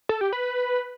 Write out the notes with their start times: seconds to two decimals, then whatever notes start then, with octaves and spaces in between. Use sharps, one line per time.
0.09 A4
0.21 G4
0.33 B4